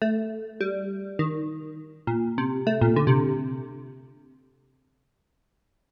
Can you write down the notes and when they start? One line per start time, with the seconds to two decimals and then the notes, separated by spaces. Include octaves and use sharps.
0.02 A3
0.61 G3
1.19 D#3
2.07 A#2
2.38 C3
2.67 A3
2.81 A#2
2.96 D3
3.07 C3